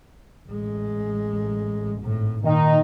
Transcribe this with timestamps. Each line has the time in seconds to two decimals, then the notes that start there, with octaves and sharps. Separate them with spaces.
0.48 A1 G#3
2.02 G#1 A2
2.44 A#2 D#3 D#4